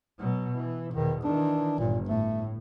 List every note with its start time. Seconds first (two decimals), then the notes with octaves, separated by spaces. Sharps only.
0.19 B2 F#3
0.57 E3
0.94 E2 B2 D#3
1.24 D#3 E3 D4
1.79 G1 A#2
2.09 A2 A3